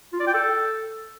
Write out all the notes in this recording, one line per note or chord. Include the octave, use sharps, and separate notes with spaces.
F4
D5
G5
A4